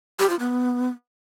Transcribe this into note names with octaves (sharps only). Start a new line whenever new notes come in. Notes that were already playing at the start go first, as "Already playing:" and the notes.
G4
F4
B3